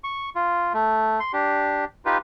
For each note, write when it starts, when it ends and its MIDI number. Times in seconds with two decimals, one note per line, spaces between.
0.04 0.30 85
0.35 0.73 65
0.74 1.20 57
1.20 1.32 84
1.33 1.85 62
1.33 1.85 67
2.05 2.18 63
2.05 2.18 65
2.05 2.18 67
2.05 2.18 71